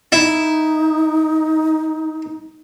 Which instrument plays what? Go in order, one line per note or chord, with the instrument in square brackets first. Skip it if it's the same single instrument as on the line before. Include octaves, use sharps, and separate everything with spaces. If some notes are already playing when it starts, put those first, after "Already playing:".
[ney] D#4 [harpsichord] E4